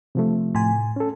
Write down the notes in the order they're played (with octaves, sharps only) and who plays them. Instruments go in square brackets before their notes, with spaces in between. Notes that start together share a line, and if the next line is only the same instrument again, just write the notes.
[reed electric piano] C3 F3 A3
[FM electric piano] A2 G#5
[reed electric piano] C#4 A4